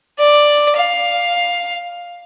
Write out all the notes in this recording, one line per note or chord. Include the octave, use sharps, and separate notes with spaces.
D5
F5